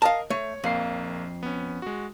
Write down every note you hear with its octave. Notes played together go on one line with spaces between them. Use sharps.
A#4 D#5 F5 A5
A3 C#5
A#1 F2 A#3 C7
B3 C#4
G#3 F#4